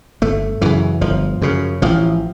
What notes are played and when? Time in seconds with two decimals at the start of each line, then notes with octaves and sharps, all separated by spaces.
0.22 G1 A3
0.61 F#2 C#3 E3
1.01 G1 F3
1.42 F#2 C#3
1.82 A1 F3